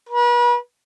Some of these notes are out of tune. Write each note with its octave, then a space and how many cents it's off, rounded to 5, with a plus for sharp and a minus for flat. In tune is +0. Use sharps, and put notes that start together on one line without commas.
B4 -40